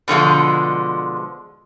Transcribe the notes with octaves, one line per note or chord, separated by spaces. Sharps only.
B2 D3 F3 G#3